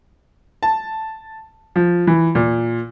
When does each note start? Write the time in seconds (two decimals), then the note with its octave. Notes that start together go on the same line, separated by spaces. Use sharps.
0.63 A5
1.76 F3
2.07 E3
2.35 A#2